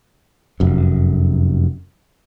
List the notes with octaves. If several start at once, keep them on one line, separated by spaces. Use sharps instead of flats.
F1 F#2